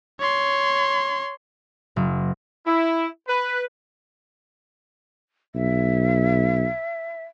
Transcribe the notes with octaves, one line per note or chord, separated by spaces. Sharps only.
C#5 C6
F#1
E4
B4
B1 E5